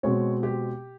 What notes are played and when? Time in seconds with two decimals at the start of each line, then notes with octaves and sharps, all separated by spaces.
0.03 B2 G#3 C4 C#5
0.43 G4